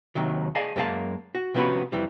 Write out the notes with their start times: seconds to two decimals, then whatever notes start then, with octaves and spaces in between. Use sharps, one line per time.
0.15 D#2 C3 D#3 F#3
0.55 G#4 D5 D#5 F5 G#5 A5
0.76 F#2 G#3 A#3 G4 F5 A5
1.35 F#4
1.54 C3 F3 B3 C#4 F#4 B5
1.92 F2 E3 G3